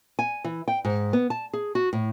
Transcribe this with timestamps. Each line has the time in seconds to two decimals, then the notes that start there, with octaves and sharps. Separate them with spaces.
0.19 G#5
0.44 E3
0.68 G5
0.85 G#2
1.13 B3
1.30 A5
1.53 G#4
1.75 F#4
1.93 A2